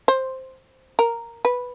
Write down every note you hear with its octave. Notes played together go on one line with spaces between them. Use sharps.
C5
A#4
B4